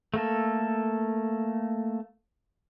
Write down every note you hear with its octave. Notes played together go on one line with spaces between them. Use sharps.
A3 A#3 A4